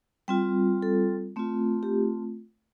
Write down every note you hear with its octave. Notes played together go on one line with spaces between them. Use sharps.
G3 C4 F4 G5
A4
A3 C4 F4
G4